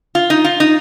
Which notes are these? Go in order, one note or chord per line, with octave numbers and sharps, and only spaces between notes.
F4
D#4
F4
D#4